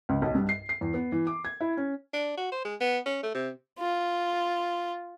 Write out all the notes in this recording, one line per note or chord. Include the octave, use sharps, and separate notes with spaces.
C#2
B1
G2
C7
C7
E2
B3
E3
D6
G#6
E4
C#4
D4
F#4
C5
G#3
B3
C#4
A3
C3
F4